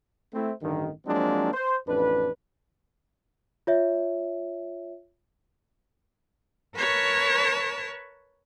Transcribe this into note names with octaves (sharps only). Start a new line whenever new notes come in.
A3 C4 E4
A1 G2 D3 D#3
F3 F#3 G#3 A#3 C4 D4
C5
A1 F2 D4 B4
F4 C#5 E5
A#4 B4 C#5 A5 C#6